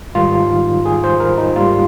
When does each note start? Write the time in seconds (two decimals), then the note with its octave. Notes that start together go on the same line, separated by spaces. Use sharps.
0.15 G#2 D#3 G3 F4
0.86 G#4
1.04 C5
1.20 A#4
1.38 D#4
1.56 G#2 G3 A#3 F4